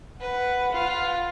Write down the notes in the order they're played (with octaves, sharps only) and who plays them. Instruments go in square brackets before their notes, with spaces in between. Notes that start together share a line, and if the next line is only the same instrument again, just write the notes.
[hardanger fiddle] B4 [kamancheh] F#5
[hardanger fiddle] F4